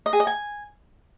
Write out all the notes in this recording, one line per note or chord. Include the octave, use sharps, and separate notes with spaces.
D#5
G#4
D#5
G#5